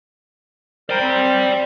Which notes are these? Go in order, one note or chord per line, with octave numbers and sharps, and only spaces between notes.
A#4 C5 D5 G5
C4